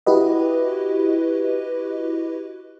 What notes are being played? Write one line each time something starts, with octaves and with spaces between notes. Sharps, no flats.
E4 F#4 G4 B4 D#5